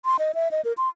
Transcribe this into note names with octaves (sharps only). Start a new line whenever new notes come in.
C6
D#5
E5
D#5
A#4
C6